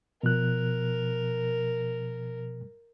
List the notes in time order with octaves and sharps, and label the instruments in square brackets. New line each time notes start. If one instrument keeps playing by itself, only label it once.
[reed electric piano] B2 F3 F#6 [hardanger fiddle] A#4